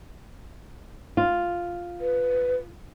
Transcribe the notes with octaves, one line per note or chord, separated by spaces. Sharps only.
F4
B4